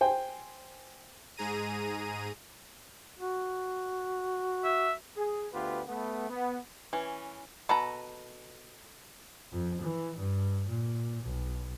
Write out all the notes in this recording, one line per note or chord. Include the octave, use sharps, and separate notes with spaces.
C5 G5 G#5
G#2 G#4 A#5 D#7
F#4
E5
G#4
D2 B3 F4 G4 B4
A3 B3
B3
E3 C#4
B2 A4 B4 A#5
F2
E3
G2
A#2
B1